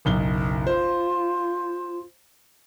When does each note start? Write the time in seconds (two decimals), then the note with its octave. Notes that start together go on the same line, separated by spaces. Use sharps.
0.05 F#1 B1 G7
0.67 F4 C5